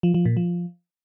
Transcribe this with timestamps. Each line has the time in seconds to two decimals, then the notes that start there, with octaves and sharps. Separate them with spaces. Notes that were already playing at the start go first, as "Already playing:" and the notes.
0.03 F3
0.14 F3
0.25 A#2
0.37 F3